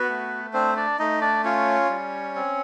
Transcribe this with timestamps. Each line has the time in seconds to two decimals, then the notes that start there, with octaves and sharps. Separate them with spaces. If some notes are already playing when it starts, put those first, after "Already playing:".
Already playing: B3 F#4 B4
0.09 A3
0.53 C4 D4 C5
0.76 D4 D5
0.99 A3 D#4 D#5
1.21 D4 D5
1.44 C#4 F4 C#5
1.89 G3
2.36 C4